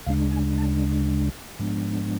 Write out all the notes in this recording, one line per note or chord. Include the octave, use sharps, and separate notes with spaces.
D2 C#3 G#3 D4 F5
G#5
A5
G#2 F3 G#3 B3 D4